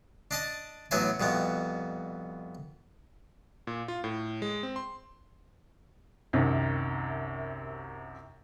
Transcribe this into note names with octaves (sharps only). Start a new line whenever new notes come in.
D4 D#5 A5
A1 A2 F#3 B3 E5 G#5
C2 F2 B2 B3
A#2
F4
A2
G#3
C4
C6
C2 F#2 C3 D#3